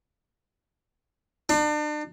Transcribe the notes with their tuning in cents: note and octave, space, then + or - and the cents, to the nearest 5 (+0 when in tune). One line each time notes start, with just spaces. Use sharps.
D4 +40